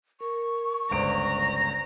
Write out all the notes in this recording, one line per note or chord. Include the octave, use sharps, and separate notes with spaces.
A#4 C#6
G1 C#2 B4 C5 D5 A#5 D7